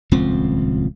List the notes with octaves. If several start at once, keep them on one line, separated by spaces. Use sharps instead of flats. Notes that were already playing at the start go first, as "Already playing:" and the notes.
D#1 C#2 F3 C4